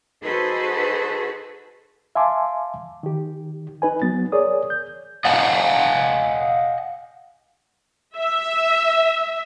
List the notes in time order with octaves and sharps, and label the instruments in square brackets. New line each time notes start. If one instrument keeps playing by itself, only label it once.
[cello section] D#4 F#4 G#4 A4 B4 C5
[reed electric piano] E5 F5 G#5 A5 C6 D6
D#3 G4
D#4 B4 G#5
F#3 B3 A6
G#4 A#4 C#5 D5 D#6
G6
[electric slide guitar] D#5 F5 F#5 G#5
[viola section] E5